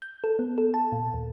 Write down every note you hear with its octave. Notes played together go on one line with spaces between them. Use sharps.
G6
A4
B3
A4
A5
A#2
D#2